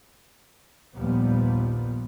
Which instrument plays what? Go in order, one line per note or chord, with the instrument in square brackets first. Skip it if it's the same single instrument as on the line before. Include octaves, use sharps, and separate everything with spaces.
[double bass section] A#1 D#2 A#2 F3 G3 B3